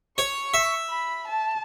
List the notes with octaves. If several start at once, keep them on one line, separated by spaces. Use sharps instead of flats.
C#5 C#6
E5
B5
A5